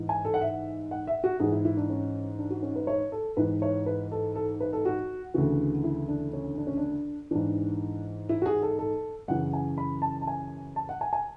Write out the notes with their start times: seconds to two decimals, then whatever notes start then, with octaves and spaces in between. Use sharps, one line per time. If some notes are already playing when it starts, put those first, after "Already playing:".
Already playing: G#2 E3
0.09 G#5
0.25 A4
0.34 F#5
0.41 E5
0.91 F#5
1.07 E5
1.24 F#4
1.40 G#2 E3 G#4
1.52 E4
1.65 E4
1.77 D4
1.90 C#4
2.39 D4
2.50 F#4
2.63 C#4
2.76 B4
2.87 C#5
3.12 A4
3.37 G#2 E3 B4
3.62 C#5
3.86 B4
4.12 A4
4.35 A4
4.60 B4
4.73 A4
4.85 F#4
5.34 D2 C#3 E3 F#4
5.84 E4
6.08 D4
6.33 C#4
6.58 D4
6.67 C#4
6.77 D4
7.31 G#2 E3 D4
8.29 E4
8.42 F#4
8.46 G#4
8.62 A4
8.79 A4
9.28 F#2 C#3 E3 F#5
9.53 G#5
9.78 B5
10.02 A5
10.21 A5
10.27 G#5
10.76 A5
10.89 F#5
11.01 G#5
11.13 G#5